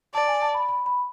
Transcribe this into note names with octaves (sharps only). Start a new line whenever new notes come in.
D5 A5
G#5
A5
B5
B5
B5